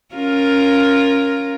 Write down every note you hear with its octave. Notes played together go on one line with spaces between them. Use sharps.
C#4 F4 A#4